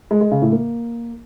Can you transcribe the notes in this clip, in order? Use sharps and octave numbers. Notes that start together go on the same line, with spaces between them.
G#3
G#3
C#3
A2
A#3